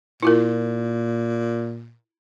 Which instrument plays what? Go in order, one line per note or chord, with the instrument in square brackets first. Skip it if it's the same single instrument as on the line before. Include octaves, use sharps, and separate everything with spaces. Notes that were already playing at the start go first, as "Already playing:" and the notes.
[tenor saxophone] A#2 [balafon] E4 F4 A#4